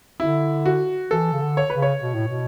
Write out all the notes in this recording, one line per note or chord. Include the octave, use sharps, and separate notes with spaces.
D3 E4
F#4
E3 A4
C#3
D3
C#5
C#3 B4
C#5
B2
A2
B2